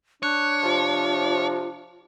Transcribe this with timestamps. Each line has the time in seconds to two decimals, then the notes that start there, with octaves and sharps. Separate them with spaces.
0.23 D4 C#5 F#6
0.63 C3 F3 F4